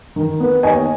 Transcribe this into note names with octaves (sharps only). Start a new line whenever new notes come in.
D#3
B3
D#2 D#5 G#5